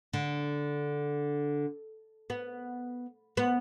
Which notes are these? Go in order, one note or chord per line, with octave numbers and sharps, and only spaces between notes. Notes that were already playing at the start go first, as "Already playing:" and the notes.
D3
B3
B3